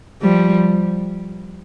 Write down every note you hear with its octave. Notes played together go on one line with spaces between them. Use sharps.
F3 G3